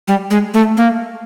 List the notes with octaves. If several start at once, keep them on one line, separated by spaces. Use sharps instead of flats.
G3
G#3
A3
A#3